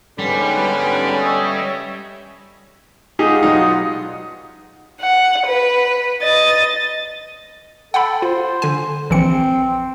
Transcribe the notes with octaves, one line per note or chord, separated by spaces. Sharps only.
G#2 D3 G3 B3 C#4 G4 B4
C#5 D#5 E5
D#4 F4 G4 G#4 F#5 D#6
B1 D#4
F#5
B4
D#5 A6
A4 F#5 G5 B5
F4 C5
D3 G#5
A#1 E3 C4 C#7